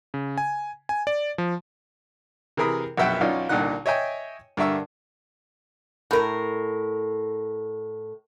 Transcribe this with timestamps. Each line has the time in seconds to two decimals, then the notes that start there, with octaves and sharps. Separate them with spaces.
0.14 C#3
0.38 G#5
0.89 G#5
1.07 D5
1.38 F3
2.57 C3 E3 G#4 A#4 B5 D#6
2.98 A#1 F#2 B2 E5 F#5 G5
3.21 B1 C#4 D#4 F4 D5
3.49 C2 A#2 D3 D#4 F#5 F#6
3.86 C#5 D#5 E5 G5 G#5
4.57 G2 D3 A#4 E5 C#6 E6
6.11 A2 A#4